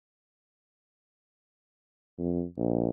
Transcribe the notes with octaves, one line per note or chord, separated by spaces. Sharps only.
F2
A#1